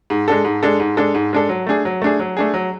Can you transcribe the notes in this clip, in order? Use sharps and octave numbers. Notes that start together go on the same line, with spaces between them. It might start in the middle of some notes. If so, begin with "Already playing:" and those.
G#2
G#3 D4 A4
G#2
G#3 D4 A4
G#2
G#3 D4 A4
G#2
G#3 D4 A4
F#3
A3 D4 G#4
F#3
A3 D4 G#4
F#3
A3 D4 G#4
F#3